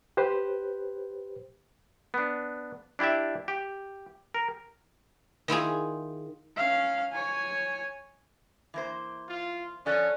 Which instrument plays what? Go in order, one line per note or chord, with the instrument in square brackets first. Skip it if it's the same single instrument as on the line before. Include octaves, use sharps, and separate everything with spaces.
[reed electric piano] G4 B4 C5
[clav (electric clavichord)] B3 D4
D4 E4 G4 D5 E5
G4
A#4
[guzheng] D#3 E4 F4 G#4
[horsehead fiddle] C#4 F5
C#5 G#5
[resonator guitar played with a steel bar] E3 A#3 C5
[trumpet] F4
[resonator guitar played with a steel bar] F3 A4 [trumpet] C#4 [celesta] D5 G#5 F#6